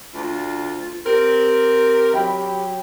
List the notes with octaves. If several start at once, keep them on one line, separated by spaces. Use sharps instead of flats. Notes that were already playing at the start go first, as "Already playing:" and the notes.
D2 F4
C4 G4 A#4
F#3 G5 B5